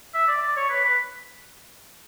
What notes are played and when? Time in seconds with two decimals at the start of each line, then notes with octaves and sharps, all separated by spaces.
0.14 E5
0.28 D5
0.42 D5
0.57 C#5
0.70 B4
0.85 B4